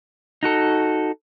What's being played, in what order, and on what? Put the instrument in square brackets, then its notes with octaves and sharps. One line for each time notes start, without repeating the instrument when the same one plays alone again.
[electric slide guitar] D#4 F#4 A4